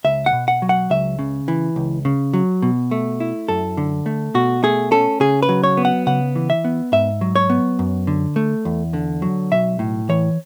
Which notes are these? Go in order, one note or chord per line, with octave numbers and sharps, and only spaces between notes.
C#2 E5
F#5
B2
F#5
F#3
F#5
C#2 E5
C#3
E3
C#2
C#3
F#3
B2
A3
E4
F#2 A4
D3
A3
B2 F#4
A3 G#4
C#4 A4
C#3 G#4
B4
F#3
C#5
B3
F#5
C#3 F#5
E3
E5
B3
G#2 E5
F#3
C#5
B3
F#2
D3
A3
E2
D3
F#3
B1 E5
A2
E3 C#5